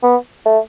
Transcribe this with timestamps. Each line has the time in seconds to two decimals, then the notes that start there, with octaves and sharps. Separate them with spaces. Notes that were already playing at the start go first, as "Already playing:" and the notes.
0.03 B3
0.46 A3